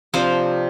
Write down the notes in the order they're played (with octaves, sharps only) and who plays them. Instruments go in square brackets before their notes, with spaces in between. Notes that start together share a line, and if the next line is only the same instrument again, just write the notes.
[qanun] C3 F3 D4 C5 F5